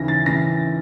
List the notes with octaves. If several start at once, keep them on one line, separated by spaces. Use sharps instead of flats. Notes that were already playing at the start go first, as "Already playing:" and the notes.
Already playing: D#2 C#3 E3 A#6
A6
C#3 E3 A#6